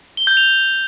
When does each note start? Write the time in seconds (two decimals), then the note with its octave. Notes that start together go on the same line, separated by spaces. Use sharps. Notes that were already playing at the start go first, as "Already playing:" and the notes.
0.17 G7
0.27 G6
0.37 F7